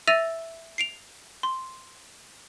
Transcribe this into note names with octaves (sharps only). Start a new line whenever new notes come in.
E5 E6 A6 A#6 D#7 F7
C7 D7 F7
C6